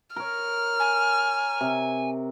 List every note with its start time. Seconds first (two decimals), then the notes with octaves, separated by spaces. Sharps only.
0.16 A#4 C#5 F6
0.79 G#5
1.61 C3